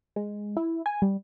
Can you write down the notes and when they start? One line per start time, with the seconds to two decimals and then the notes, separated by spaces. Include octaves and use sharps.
0.16 G#3
0.57 E4
0.86 G#5
1.02 G3